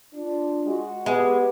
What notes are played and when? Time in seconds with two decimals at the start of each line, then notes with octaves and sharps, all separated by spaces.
0.14 D4 F4
0.66 G#3 F#4
1.06 G#3 B3 G4